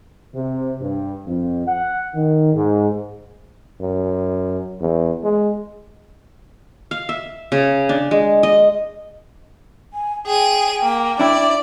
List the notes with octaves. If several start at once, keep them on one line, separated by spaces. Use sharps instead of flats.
C3
G2
F2
F#5
D#3
G#2
F#2
E2
G#3
F5
E5
C#3
D4
G#3
D#5
G#5
G#4 G5 D#7
A#3
D4 E4 D5